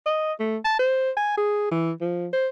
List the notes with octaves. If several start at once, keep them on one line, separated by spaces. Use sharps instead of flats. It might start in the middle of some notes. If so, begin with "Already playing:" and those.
D#5
A3
A5
C5
G#5
G#4
E3
F3
C5